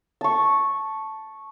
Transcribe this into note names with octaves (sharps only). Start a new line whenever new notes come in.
A5 C#6